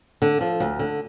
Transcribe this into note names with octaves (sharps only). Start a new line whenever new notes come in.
D3
F3
D2
D3